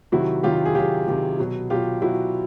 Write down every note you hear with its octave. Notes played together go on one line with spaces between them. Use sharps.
C3 D#3 F#3 E4 F#4
C3 D#3 F#3 F4 G4
G#4
C3 D#3 F#3 F4 G4
C3 D#3 F#3
B2 F#3
B2 F#3 F4 G4
B2 F#3 E4 F#4